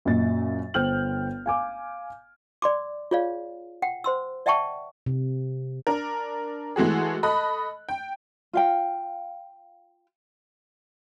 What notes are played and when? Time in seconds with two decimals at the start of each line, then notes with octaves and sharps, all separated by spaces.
0.05 F#2 A#2 D#5 A6
0.74 G1 C5 G5 F6 G6 F#7
1.46 F5 G#5 D6
2.62 D5 C6 D6
3.11 F4 G#4 C#5 D5 F5
3.82 F#5 G5
4.04 C5 C6 E6
4.46 D5 E5 F#5 G5 A5 C#6
5.06 C3
5.87 D4 A#4
6.76 E3 G#3 A3 F#4 G#4
7.23 A4 D#5 B5 F#6
7.89 G5
8.53 F4 F5 G5